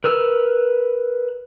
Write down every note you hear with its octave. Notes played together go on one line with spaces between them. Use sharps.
A#4 B4 E6 F6